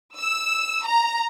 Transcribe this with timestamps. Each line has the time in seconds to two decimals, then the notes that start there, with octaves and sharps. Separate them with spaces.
0.17 E6
0.84 A#5